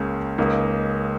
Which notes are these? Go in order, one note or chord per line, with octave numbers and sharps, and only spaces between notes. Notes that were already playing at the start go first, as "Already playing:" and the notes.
Already playing: C#2 C#3 A#3
C#2 C#3 A#3 D#4